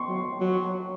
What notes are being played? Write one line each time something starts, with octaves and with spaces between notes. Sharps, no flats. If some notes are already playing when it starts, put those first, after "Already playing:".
Already playing: C6 C#6
F#3
F#3
F#3